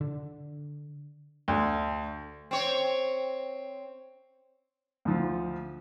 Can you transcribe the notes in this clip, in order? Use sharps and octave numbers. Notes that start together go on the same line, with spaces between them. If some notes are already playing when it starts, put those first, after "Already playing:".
D3
D2
C4 C#5
D2 F3